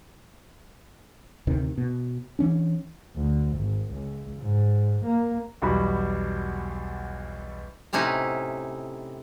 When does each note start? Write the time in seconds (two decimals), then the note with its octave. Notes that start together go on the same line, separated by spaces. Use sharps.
1.47 D2 C3 D#3
1.78 B2
2.39 E3 C#4 D4
3.16 D2
3.58 G#1
3.93 C#2
4.42 G#2
5.06 A#3
5.62 B1 E2 G3 F#4 B5
7.93 A2 C3 C#4 D#4 E4 F#5